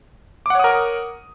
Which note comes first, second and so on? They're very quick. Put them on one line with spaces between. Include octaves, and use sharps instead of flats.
D6 F#5 C#5 D#6 A#4